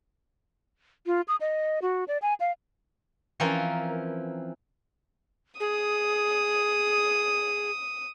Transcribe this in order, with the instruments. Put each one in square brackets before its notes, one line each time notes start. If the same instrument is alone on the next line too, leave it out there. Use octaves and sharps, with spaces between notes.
[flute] F4
D#6
D#5
F#4
D5
G#5
F5
[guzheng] E3 F3 C4 C#4 F4 A#4
[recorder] G#4 [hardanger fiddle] D#6